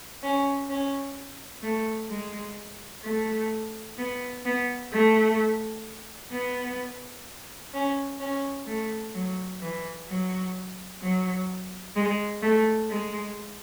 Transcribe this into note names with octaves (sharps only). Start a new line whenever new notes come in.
C#4
C#4
A3
G#3
A3
B3
B3
A3
B3
C#4
C#4
A3
F#3
E3
F#3
F#3
G#3
A3
G#3